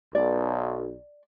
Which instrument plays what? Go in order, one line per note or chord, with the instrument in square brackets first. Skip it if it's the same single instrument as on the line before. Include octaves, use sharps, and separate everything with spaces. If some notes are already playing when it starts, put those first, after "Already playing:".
[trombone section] B1 [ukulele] D5